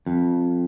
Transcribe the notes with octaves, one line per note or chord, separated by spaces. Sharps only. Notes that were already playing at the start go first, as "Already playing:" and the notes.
F2